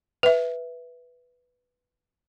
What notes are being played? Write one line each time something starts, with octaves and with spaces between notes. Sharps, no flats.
B4 E5